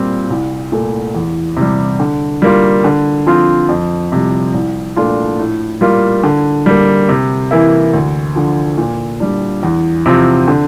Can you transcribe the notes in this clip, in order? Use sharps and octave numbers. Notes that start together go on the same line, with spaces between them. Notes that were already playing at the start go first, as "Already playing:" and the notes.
Already playing: A#2 G3 C4
C2
A#2 A3
E2
C3
G3
D3
G3 A#3 F4
D3
F3 C4 F4
F2
C3 G3
C2
A#2 A3 D4 F4
A2
G3 A#3 F4
D3
G3 A#3
C3
E3 A#3 E4
D2
D3 F3
A#2
G3 D4
E2
C3 F3 C4 F4
D3